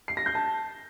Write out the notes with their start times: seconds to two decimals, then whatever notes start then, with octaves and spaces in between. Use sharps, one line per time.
0.08 C7
0.17 A#6
0.26 G6
0.35 A5